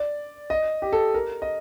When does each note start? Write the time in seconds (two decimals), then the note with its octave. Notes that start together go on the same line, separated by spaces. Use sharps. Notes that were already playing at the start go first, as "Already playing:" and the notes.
Already playing: D5
0.50 D#5
0.82 G4
0.93 A4
1.14 A#4
1.42 D#5